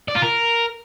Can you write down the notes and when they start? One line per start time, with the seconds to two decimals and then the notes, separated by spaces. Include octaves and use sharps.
0.08 D5
0.15 F4
0.22 A#4